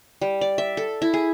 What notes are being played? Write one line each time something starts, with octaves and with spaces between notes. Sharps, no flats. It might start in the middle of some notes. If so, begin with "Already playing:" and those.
G3
D5
E5
A4
E4
G#4